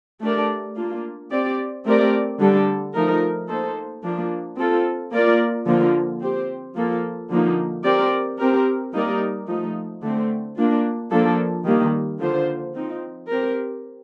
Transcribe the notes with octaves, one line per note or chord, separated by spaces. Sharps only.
A3 D4 G4 A#4 D5
A#3 D4 F4
C4 G4 D5
A3 C4 G4 A#4 D5
D3 G3 D4 A4
F3 A3 D#4 A#4
A#3 D#4 A4 C5
F3 A#3 D4 F4
C4 F4 A4
A#3 F4 A#4 D5
D3 F3 A#3 F4
C4 G4 C5
F3 A#3 F4 A4
D3 F3 A#3 D#4
C4 G4 A#4 D5
C4 G4 A#4
G3 A#3 D#4 A#4 D5
F3 A3 D#4
D3 A3 C4
A#3 D4 F4
F3 A#3 D4 A4
D#3 G3 A#3
D3 F3 A#3 F4 C5
F3 C4 D#4
C4 G4 A#4